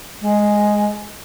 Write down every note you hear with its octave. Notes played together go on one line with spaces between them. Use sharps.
G#3